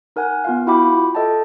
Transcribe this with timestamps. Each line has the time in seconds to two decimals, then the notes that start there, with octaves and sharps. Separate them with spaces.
0.16 D#4 A#4 F#5 G#5 F#6
0.44 B3 F4 F5
0.67 E4 F#4 E5 G5 B5 D6
0.95 F4
1.15 A4 D#5 E5 G5 A5